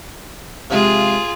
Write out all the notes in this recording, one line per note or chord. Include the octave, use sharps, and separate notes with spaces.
C3 F3 G#3 F4 G#4